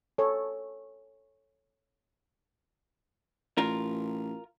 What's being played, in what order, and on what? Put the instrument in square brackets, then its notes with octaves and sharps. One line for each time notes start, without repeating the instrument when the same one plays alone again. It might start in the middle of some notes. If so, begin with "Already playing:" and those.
[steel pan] A4 C#5
[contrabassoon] A1 [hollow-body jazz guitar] F4 A#4